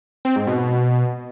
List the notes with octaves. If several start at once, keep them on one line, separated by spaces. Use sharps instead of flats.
C4
G#2
B2